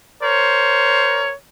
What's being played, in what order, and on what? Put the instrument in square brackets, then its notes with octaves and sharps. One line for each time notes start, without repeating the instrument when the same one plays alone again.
[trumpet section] A#4 C5 C#5